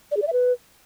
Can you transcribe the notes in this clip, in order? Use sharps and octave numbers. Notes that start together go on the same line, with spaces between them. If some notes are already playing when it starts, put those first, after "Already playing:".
D5
G#4
D5
E5
B4